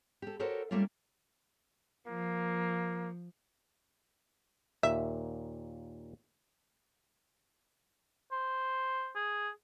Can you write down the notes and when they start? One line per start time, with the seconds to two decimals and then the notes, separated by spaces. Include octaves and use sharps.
0.22 G4 A4
0.40 F#4 G4 A4 A#4 C5 C#5
0.71 G3 A3 A#3 C#4 F4
2.08 F3 A#3
4.83 D#2 A#2 E5
8.32 C5
9.16 G#4